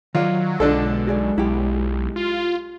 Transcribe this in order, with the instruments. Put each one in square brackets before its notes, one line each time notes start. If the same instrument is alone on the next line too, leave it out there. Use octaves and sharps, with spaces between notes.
[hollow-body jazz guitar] D#3 D5 [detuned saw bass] F#3 [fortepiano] F4
[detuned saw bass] B1 [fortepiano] D3 D4 A4 [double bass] G#3 [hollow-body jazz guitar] F4 D#5
[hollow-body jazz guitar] F#4 G#4 D5
[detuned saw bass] B1 [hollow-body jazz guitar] E4 G4
[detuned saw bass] F4